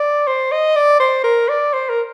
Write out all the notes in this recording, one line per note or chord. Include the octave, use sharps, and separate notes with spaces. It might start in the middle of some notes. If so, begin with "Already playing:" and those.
Already playing: D5
C5
D#5
D5
C5
A#4
D5
C5
A#4